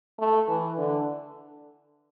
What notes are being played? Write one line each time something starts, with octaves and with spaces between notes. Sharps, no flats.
A3
E3
D3